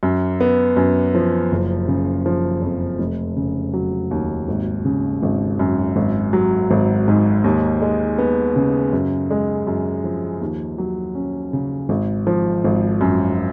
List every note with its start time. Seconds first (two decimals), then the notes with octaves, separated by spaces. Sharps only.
0.03 F#2
0.40 B3
0.77 F#2
1.15 F3
1.52 F#1
1.88 C#3
2.26 F3
2.62 F2
2.99 F1
3.37 C#3
3.74 F#3
4.11 D#2
4.48 G#1
4.85 C#3
5.23 G#1
5.59 F#2
5.96 G#1
6.33 F#3
6.71 G#1
7.08 G#2
7.44 D#2
7.82 G#3
8.18 B3
8.56 C#3
8.93 F#2
9.31 G#3
9.67 F#2
10.04 F3
10.41 D#2
10.78 F#3
11.15 C#4
11.53 C#3
11.89 G#1
12.27 F3
12.64 G#1
13.01 F#2